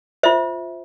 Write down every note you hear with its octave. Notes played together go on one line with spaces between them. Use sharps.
F4 C5 E5